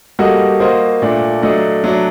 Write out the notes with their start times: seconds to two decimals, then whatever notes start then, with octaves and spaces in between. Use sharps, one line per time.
0.19 G3 A#3 F#4 A4 D#5
0.60 A#3 F#4 C5 D#5
1.02 A#2 A3 D4
1.42 F#3 A3 D4 A4 D#5
1.84 F#3 A3 D4